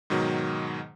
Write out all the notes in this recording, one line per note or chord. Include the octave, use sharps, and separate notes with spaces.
G#2 B2 D#3 F#3